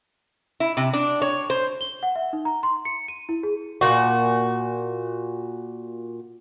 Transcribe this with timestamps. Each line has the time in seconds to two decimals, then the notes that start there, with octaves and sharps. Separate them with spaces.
0.60 E4
0.77 C3
0.93 D4
1.22 C#5
1.50 C5
1.81 G7
2.03 F#5
2.16 E5
2.33 D#4
2.45 A#5
2.63 C6
2.85 C#7
3.08 D#7
3.29 E4
3.43 G#4
3.81 A#2 F#4